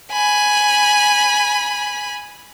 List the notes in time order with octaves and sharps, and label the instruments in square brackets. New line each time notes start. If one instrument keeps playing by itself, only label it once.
[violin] G#5 B5